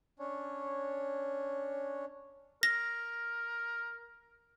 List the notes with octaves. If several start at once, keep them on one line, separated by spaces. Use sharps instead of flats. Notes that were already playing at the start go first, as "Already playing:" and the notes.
C#4 D4 C#5
A#4 A#6